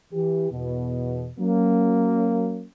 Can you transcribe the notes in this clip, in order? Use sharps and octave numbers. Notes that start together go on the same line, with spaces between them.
E3 G4
E2 B2
F#3 A#3 C#4